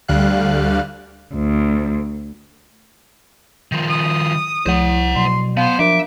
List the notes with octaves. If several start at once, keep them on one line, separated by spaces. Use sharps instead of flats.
D2 D3 G3 F5 F#6
D2
D#3 F3
D#6
C2 F3 E4 C5 F#5
B2 F#3 C6
B3 C5 F5
F3 D4 A#4 E5 D6